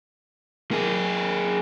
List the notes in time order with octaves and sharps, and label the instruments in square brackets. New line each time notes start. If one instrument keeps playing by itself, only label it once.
[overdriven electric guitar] A#3 G#4